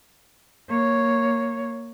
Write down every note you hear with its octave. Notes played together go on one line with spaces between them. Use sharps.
A#3 C#5